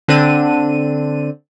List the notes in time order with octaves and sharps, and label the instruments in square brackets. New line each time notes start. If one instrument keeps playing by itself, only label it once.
[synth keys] D3 C4 D4 D#7